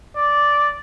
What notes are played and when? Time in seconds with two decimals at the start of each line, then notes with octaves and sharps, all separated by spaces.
0.17 D5